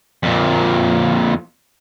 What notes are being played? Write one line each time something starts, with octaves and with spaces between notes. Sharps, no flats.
F2 A#2